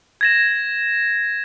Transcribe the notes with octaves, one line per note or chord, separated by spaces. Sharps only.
G#6 A#6 E7